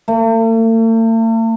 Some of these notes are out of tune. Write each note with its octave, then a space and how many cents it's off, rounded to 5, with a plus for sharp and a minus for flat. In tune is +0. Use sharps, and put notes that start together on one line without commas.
A3 +45